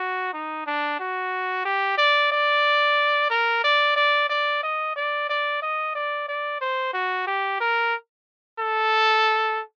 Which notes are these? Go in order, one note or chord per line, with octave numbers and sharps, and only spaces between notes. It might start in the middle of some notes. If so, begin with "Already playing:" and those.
Already playing: F#4
D#4
D4
F#4
G4
D5
D5
A#4
D5
D5
D5
D#5
D5
D5
D#5
D5
D5
C5
F#4
G4
A#4
A4